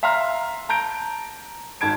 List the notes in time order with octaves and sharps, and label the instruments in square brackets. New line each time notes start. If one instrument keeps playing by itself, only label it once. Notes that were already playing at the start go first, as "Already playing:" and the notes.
[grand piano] E5 F5 A#5 C6 F6
A5 A#5 G6 D7
G#1 G#2 A5 G#6 D7